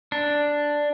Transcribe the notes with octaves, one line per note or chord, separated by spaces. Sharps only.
D4